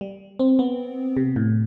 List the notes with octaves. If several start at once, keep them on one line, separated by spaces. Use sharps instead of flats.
G3
C4
B3
C3
A2